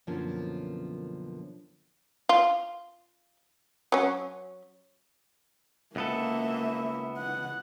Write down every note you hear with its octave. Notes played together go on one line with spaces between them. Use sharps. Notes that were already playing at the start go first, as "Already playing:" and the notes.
F#2 B2 D3 F3 A#3 C#4
F4
F#3 C#4
C#2 A#3 B3 A4 E5
F#5